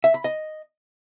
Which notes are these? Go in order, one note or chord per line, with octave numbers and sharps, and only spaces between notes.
E5
B5
D#5